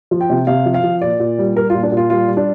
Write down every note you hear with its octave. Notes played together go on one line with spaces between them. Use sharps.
F3
G5
C3
C3 F5
F3
F5
F3
A#2 D5
A#2
G3
G3 A#4
F4
A#2
D4
A#2
F4
G3 F4
G3
D4